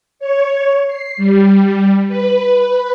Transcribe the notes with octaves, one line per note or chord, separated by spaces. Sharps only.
C#5
C7
G3
B4